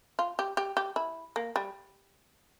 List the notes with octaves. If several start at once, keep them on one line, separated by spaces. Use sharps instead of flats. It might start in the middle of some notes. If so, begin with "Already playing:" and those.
F4
G4
G4
G4
E4
A#3
G3